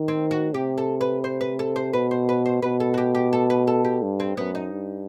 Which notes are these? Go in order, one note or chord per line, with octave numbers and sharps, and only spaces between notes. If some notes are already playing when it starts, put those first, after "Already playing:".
Already playing: D#3
C4
F#4
C3 G4
A4
B4
C5
B4
A4
C5
B2 B4
C5
B4
C5
B2 B4
A4
F#4
G4
G4
A4
B4
A4
G4
G2
C4
F#2 B3
D#4
G2